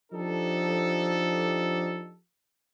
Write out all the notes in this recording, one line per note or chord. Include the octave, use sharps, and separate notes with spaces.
F3 D4 D#4 G4 A4